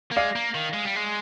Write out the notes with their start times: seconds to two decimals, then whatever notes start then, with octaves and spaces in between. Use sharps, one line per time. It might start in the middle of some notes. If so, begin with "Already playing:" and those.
0.11 A#3
0.16 G#3 D5 F5
0.36 A#3
0.55 D#3
0.74 G#3
0.85 G3
0.96 G#3